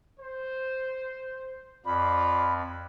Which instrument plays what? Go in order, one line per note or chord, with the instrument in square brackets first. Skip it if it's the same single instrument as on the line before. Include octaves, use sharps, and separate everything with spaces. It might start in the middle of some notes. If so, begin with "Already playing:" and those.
[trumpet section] C5
[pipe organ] F2 [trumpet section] F4 D5 [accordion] B5